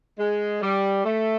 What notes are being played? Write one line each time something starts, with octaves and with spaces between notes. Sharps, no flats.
G#3
G3
A3